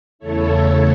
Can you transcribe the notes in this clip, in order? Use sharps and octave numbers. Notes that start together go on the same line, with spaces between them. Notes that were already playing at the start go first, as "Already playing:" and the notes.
E2 C#3 A3 E4 A4 C#5